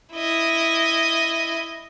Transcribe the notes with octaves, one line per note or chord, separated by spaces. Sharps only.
E4 D#5